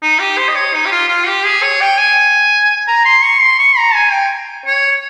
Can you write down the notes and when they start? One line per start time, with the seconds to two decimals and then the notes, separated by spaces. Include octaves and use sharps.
0.02 D#4
0.20 G4
0.38 C5
0.48 D#5
0.55 C#5
0.74 D#4
0.86 G4
0.92 F4
1.09 F4
1.27 G4
1.45 G#4
1.63 C#5
1.81 G5
1.98 G#5
2.88 A#5
3.05 C6
3.23 C#6
3.41 C6
3.59 C#6
3.77 A#5
3.95 G#5
4.12 G5
4.66 C#5